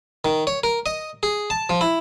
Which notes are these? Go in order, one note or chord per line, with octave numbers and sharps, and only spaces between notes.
D#3
C#5
A#4
D#5
G#4
A5
F3
E4